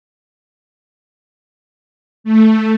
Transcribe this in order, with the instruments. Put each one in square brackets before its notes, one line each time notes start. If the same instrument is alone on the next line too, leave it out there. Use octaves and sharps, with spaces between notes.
[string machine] A3